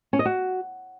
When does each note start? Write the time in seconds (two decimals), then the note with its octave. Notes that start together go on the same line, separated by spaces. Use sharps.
0.13 C#4
0.19 D#5
0.25 F#4